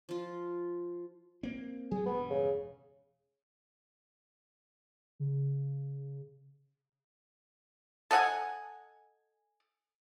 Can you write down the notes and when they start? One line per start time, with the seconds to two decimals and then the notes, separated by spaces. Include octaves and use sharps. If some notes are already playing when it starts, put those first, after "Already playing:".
0.09 F3 F4
1.43 A#3 C4
1.91 F#3 A3 G#4
2.06 E1 G2 B3
2.30 C#3
5.20 C#3
8.11 A4 D#5 F#5 G#5